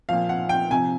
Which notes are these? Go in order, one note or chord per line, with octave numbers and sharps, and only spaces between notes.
A#2 F3 F5
F#5
G5
C3 F3 G#5